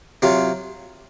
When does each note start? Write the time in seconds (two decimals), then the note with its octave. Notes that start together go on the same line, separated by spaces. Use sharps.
0.22 C3 F#3 C4 F4